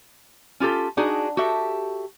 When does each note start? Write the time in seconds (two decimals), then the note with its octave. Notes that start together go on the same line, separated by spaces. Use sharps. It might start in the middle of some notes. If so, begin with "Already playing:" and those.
0.60 C#4 F4 G4 A4
0.97 D4 D#4 F#4 G#4
1.37 F#4 G4 A4 E5